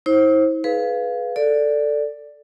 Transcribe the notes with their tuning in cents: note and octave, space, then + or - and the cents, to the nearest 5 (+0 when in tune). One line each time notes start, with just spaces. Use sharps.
E4 -45 C5 +25
G#4 +30 B4 +0 F5 +0
A4 +10 D5 +0